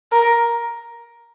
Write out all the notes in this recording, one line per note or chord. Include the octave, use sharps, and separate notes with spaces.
A#4